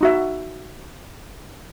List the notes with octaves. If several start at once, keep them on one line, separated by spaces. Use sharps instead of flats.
D#4 F#4 E5